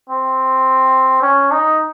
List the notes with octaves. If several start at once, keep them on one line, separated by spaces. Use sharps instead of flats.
C4
C#4
D#4